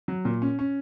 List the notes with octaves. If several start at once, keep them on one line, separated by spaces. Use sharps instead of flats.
F#3
A#2
C#4
C#4